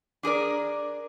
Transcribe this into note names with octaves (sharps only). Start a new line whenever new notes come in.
D4 G#4 A#4 D5